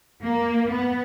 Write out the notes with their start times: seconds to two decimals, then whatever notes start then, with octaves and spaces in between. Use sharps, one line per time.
0.23 A#3
0.71 B3